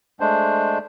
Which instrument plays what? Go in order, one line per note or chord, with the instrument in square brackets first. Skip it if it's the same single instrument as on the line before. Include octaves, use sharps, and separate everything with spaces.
[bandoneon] G#3 A3 D4 C5